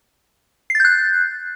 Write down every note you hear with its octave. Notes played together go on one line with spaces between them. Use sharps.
F#6 G6 A6 C7